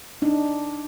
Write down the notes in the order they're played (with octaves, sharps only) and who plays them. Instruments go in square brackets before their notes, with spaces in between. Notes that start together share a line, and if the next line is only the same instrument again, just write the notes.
[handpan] D4 D#4